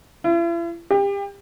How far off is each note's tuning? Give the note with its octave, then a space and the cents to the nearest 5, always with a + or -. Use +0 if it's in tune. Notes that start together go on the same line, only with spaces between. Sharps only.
E4 +45
G4 +30